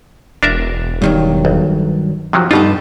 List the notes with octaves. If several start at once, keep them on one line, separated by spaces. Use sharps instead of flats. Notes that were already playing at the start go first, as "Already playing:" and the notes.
E1 D4 A#4 E5
G2 D#3 F#3
B1
C3 D#3 F3 F#3
G2 B2 D#4 F4 G4 A4